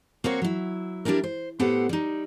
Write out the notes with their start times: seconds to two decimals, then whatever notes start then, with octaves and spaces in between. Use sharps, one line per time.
0.24 A#3 C4 F#4 C#5
0.42 F#3 E4
1.05 G3 D4 E4 G4 A#4
1.24 C5
1.59 A2 B3 G4 A4 C5 F#5
1.89 G3 D#4